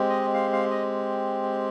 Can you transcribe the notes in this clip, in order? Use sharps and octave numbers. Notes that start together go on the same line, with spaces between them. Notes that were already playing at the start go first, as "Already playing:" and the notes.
Already playing: G#3 C4 G4
D#5
F5
F5
D#5